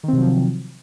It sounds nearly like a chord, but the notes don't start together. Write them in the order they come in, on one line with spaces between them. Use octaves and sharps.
D#3 C4 C3 F#3 F3